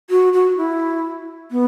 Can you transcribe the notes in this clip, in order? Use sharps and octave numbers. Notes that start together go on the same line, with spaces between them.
F#4
F#4
E4
B3